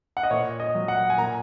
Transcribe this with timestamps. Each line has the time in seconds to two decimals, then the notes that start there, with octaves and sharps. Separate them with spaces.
0.17 F#5
0.23 D#5
0.31 A#2 C#5
0.60 D#5
0.75 F#3
0.88 F#5
1.10 G#5
1.18 A#2 A#5